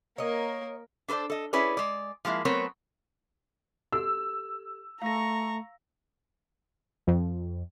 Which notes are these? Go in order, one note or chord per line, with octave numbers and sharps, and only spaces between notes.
A#3 A#4 C#5 D#5
D4 A4 B4 C5 D5
A4 D#5
C#4 E4 G#4 B4 C#5 D5
G#3 D5
F3 G#3 A#3 E4
F#3 A3 B3 C4 A#4 C#5
G4 A4 E6
A3 F5 A#5 C#6 A#6
F2